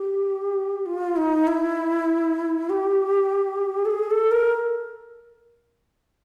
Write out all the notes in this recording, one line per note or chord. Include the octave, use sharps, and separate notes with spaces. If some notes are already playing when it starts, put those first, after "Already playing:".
Already playing: G4
F4
D#4
E4
G4
A4
G#4
A4
A#4